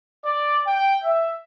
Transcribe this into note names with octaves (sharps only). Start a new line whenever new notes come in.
D5
G5
E5